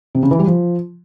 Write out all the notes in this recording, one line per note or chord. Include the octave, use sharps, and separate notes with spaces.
C3
C#3
E3
G3
F3